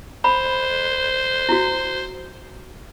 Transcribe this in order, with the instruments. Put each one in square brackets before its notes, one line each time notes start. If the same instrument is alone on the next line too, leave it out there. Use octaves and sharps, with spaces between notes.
[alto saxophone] C5 [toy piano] B5
[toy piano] E4 F#4